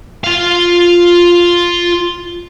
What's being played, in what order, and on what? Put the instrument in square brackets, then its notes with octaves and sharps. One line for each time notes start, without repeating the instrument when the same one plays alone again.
[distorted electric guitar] F4 F5